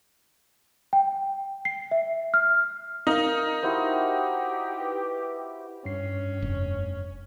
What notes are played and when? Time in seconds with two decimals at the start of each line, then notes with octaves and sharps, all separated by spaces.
0.93 G5
1.65 C7
1.91 E5
2.34 F6
3.07 D#4 A#4 F5
3.63 E4 F#4 G4 C5
4.80 B4
5.85 G2 C#4 C7
6.42 F1